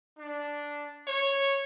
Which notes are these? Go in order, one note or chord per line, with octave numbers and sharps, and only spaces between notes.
D4
C#5